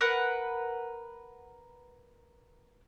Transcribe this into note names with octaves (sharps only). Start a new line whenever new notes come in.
A#4 B4 F#5